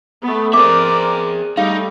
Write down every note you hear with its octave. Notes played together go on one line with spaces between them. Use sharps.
A3 B3
C4 G#4 A#4 D5 E5 D6
G3 A3 D#4 F5